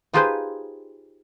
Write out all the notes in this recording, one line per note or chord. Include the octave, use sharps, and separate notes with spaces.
D#4 F4 G4 G#4 B4 C5